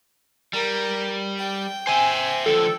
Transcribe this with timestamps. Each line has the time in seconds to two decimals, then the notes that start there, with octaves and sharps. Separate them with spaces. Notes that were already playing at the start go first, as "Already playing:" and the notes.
0.53 G3 A#4
1.39 G5
1.87 C5 E5 G#5
2.46 D3 F3 A4